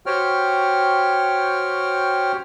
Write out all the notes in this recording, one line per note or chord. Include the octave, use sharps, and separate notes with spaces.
F#4 G4 C5 C#5 G5 F6